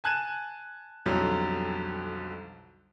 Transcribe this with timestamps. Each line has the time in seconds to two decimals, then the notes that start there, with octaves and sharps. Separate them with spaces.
0.04 G#5 A5 F#6 G#6 D#7 E7
1.06 B1 F2 D3 F#3 G3